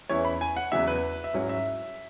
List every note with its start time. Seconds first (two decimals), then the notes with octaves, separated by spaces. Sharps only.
0.09 E2 E3 C#4 E4 C#5
0.25 B5
0.41 G#5
0.57 F#5
0.72 E2 C#3 F#3 E4 E5
0.88 B4
1.24 E5
1.34 G#2 F#3 C#4 E4 C#5
1.49 E5